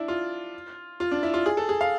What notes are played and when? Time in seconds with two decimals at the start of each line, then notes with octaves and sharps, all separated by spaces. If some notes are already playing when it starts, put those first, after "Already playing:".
Already playing: D4 E4
0.08 F4
1.00 F4
1.11 D4
1.23 E4
1.34 F4
1.46 G#4
1.57 A4
1.69 G#4
1.81 F5